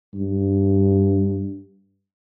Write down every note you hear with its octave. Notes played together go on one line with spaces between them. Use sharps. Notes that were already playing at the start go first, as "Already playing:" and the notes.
G2